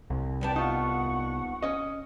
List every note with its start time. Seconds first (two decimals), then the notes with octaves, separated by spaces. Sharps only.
0.10 C2
0.41 D#2 B3 D5 G5 A5
0.56 D#4 F4 F#5 C#6
1.63 C#4 D#5